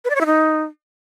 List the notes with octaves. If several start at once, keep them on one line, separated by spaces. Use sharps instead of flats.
B4
D5
C#5
E4
D#4